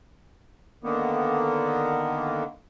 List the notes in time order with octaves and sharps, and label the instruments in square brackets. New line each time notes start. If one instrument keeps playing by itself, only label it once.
[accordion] D3 D#3 A#3 B3